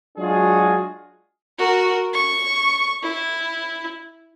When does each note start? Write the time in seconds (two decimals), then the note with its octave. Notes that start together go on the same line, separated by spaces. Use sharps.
0.18 F#3 G#3 D4 F4 F#4 G#4
1.58 F#4 A#4
2.13 C#6
3.03 E4